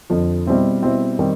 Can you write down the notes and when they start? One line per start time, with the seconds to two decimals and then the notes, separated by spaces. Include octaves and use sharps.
0.10 F2 D3 F3
0.47 B2 G3 C4 E4
0.82 B2 G3 C4 E4
1.19 D#3 G3 C4